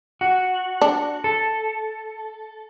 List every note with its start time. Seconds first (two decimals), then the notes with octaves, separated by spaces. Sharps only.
0.21 F#4
0.81 D4
1.24 A4